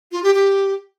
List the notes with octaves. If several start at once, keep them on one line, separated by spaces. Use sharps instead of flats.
F4
G4
G4